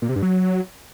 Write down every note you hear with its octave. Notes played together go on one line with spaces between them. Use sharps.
A#2
C3
G2
F#3